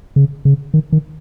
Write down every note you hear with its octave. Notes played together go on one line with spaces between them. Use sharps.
C#3
C#3
D#3
D#3